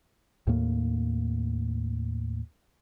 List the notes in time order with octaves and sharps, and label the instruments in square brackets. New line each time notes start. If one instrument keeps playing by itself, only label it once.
[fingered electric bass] D#2 A2 A#3